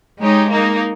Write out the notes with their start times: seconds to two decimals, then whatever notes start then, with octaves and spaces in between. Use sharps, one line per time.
0.19 G#3 D#4 G4 C#5
0.50 A#3 D#4 A#4